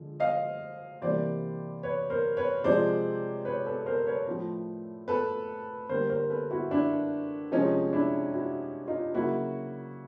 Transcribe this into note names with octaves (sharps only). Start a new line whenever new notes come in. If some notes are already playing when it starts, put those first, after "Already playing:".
Already playing: D3 F3 G#3
D#5 F5
C3 E3 G3 A#3 C5 D5
B4 C#5
A#4 C5
B4 C#5
C3 F3 G#3 C5 D5
B4 C#5
A4 B4
A#4 C5
B4 C#5
A2 F3 A3
A4 B4
D3 G3 A#3 A#4 C5
A#4 C5
A4 B4
E4 F#4
D4 E4
C3 F3 G#3 C#4 D#4
D4 E4
E4 F#4
D#4 F4
C#3 F#3 A#3 E4 F#4